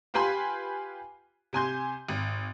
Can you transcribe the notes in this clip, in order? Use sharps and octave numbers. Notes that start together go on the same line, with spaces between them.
F4 G4 B4 G#5 B5 C6
C3 G#5 C6 G6
G#1